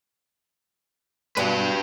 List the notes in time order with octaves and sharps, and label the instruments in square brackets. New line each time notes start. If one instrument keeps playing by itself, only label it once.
[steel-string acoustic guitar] G2 B2 [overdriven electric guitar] G4 B4